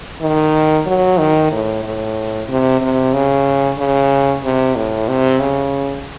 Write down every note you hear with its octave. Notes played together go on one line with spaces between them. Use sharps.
D#3
F#3
D#3
A2
A2
C3
C3
C#3
C#3
C3
A2
C3
C#3